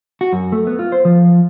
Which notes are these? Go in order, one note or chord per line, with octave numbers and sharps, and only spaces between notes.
F#4
F#2
A3
B3
F4
C5
F3